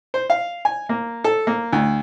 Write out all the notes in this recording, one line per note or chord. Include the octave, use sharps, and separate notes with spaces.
C5
F5
G#5
A#3
A4
A#3
D2